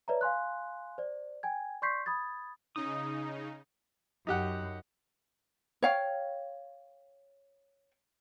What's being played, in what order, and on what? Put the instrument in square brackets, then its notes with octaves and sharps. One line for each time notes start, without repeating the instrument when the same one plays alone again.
[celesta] B4 C#5 D5 E5 A5 A#5
F5 G#5 C6 F#6
C5 D5
G5 G#5 G#6
D5 C6 C#6 G6 B6 C7
B5 D#6 G#6 A6
[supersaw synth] C#3 D#4 [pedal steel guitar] D#6
[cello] F#2 [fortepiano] D#4 G4 F#5
[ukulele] C#5 F5 G5